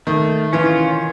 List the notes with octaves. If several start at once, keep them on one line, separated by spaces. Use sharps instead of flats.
D#3 A3
E3 C#4 F4